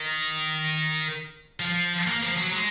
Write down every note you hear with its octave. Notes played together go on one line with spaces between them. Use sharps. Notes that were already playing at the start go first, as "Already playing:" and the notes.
Already playing: D#3
F3
A#3
F3
F#3
G#3